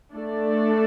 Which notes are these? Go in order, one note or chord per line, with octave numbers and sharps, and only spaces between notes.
A3 D4 A4 D5